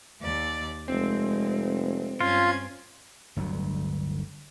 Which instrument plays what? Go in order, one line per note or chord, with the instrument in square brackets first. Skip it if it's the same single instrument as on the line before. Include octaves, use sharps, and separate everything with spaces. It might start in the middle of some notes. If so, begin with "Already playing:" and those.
[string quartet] D#2 D5
[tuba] F1 [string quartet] G#3 [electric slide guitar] C4
[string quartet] G2 C#4 G#6 [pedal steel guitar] F4
[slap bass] G1 D2 F#3